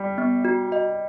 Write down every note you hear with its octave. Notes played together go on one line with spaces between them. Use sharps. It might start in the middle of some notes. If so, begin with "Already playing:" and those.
Already playing: G3
B3
F#4
D#5